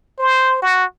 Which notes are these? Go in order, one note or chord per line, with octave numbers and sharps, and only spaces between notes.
C5
F#4